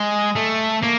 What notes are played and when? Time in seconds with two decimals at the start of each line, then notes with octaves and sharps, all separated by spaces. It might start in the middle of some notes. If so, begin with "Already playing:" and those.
Already playing: G#3
0.36 A3
0.83 A#3